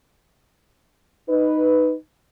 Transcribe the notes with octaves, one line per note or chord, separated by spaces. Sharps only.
D#4 B4